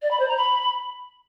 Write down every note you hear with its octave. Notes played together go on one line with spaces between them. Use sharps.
D5
B5
C5
A#5
B5